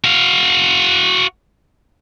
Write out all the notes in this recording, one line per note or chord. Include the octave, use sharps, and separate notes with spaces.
F#4 F5